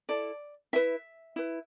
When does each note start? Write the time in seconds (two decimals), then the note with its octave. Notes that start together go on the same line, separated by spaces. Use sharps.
0.09 E4 A4 D5
0.73 E4 B4 E5
1.36 E4 B4